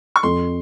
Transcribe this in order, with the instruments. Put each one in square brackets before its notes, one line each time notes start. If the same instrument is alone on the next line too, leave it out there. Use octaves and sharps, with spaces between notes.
[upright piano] C#6
[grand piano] F2 [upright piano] C6